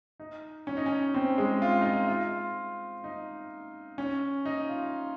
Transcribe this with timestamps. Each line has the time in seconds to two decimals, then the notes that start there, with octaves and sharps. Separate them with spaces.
0.20 D#4
0.67 C#4
0.77 D#4
0.86 C#4
1.14 C4
1.38 G#3
1.62 F4
1.81 D#4
1.85 F4
2.08 F4
3.04 D#4
3.98 C#4
4.45 D#4
4.69 F4